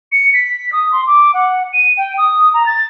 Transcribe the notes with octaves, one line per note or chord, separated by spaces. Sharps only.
C#7
B6
D#6
C6
D6
F#5
D#7
G5
D#6
A#5
A6